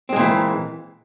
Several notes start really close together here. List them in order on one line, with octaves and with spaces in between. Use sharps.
C4 G#3 A#2 E3